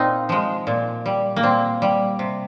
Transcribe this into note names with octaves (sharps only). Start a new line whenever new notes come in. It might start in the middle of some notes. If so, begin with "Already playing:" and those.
Already playing: A#2 C4 D#4 F4
F3 G#3
A#2
G3
A#3
A#2 C4
G3
C3